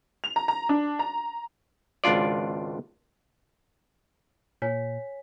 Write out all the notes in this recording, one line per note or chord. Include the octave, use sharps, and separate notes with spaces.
F7
A#5
A#5
D4
A#5
G#1 C#2 D4 F4 D5
A#2 C#5 G#5 B6